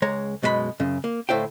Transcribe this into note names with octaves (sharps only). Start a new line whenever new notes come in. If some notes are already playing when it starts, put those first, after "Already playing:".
C#2 G#3 C#5 A#5
F#2 B2 G#3 G4 B5
F#2 C#3
A#3
D2 A2 E4 C5 F5 G5